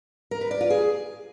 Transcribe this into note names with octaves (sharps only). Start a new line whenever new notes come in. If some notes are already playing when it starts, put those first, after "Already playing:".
A#4
B4
D5
F4
G#4